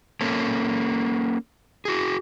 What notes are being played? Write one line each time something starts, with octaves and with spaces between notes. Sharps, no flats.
A#3 C#4 A4
F#4 G#4